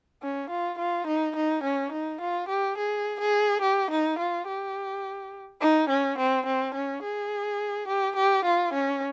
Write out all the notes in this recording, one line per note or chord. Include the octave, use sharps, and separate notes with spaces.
C#4
F4
F4
D#4
D#4
C#4
D#4
F4
G4
G#4
G#4
G4
D#4
F4
G4
D#4
C#4
C4
C4
C#4
G#4
G4
G4
F4
C#4